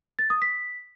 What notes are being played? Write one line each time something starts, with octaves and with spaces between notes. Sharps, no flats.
A6
D#6
B6